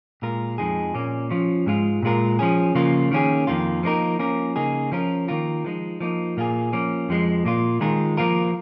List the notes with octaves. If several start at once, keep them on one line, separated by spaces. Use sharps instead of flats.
A#2 G#3 F4 A#4
F2 F3 G#3 D#4 G#4
A#2 A#3 C#4
F3 C#4 F4
G#2 G#3 F4
A#2 G#3 F4 A#4
F3 C#4 G#4
C#3 F3 A#3 F4
D#3 A#3 C#4 G#4
F2 D#3 A#3 F4
F3 A#3 D#4 A#4
F3 A#3 C#4 A#4
C#3 A#3 D#4 G#4
F3 C#4 F4 A#4
D#3 A#3 F4 A#4
F3 G#3 D#4
F3 A#3 D#4
A#2 A#3 F4 G#4
F3 A#3 C#4
F2 F3 G#3
A#2 A#3 F4
D#3 G#3 F4 A#4
F3 A#3 F4 A#4